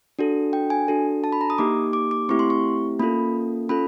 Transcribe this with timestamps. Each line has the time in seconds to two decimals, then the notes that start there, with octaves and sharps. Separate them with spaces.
0.19 D4 F#4 A4
0.53 G5
0.70 G#5
0.88 D4 F#4 A4
1.24 A5
1.33 B5
1.41 A#5
1.50 D#6
1.58 A#3 D#4 G4 D6
1.93 D6
2.11 D6
2.29 A3 C4 E4 G4 C#6
2.39 C6
2.50 C#6
2.99 A#3 C#4 F4 A4 B5
3.69 C#4 F4 A4 B5